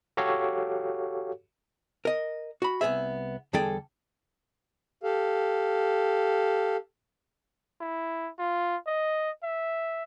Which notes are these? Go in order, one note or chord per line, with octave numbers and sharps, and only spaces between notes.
F#4 G4 A4 C#5 F5
A#4 D#5
F#4 B5
C2 F#2 B3 G#4 E5
E2 D3 G3 G#4 A4 G5
G4 A4 F5
E4
F4
D#5
E5